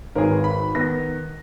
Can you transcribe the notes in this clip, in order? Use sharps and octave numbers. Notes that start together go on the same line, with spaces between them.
G#1 G#4 A#4 B4 C#5
B5
D#3 B3 A#6